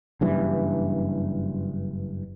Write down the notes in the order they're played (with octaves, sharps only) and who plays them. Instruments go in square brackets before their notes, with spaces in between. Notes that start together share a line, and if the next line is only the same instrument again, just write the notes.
[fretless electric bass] F#1 G2 E3